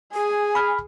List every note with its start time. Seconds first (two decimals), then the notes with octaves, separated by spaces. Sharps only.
0.14 G#4 G#5
0.55 B5 F6